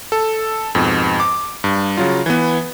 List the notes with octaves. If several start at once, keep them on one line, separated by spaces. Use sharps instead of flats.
A4
F2 G#2 B2
D6
G2
C#3 F#3 F4
E3 B3